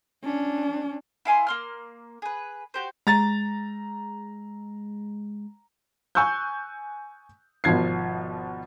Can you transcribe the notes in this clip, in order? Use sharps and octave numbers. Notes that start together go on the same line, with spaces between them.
C#4 D4
E4 F5 G#5 C6
A#3 C6 F6
G#4 B4
F#4 G4 C5
G#3 A#5 A6
G#5 C#6 E6 F#6 G6
G#1 B2 F3 G#6 C7